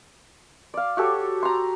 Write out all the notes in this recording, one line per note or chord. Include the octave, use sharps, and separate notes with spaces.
D5 F5
F#4 G4 A4 C#5
A#5 C6